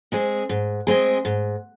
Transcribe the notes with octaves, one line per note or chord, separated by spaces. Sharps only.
G#3 C4 G#4
G#2
G#3 C4 G#4
G#2